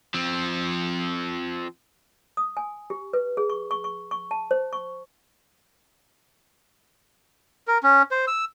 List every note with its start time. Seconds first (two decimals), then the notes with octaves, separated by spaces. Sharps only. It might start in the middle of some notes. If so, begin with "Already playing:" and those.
0.14 F3 C4
2.37 D#6
2.57 G#5
2.90 G4
3.13 B4
3.37 G#4
3.50 C#6
3.71 C#6
3.84 C#6
4.11 C#6
4.31 A5
4.51 C5
4.73 C#6
7.68 A#4
7.83 C#4
8.11 C5
8.27 E6